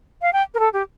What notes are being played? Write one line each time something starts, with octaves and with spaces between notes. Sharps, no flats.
F5
G5
A#4
A4
G4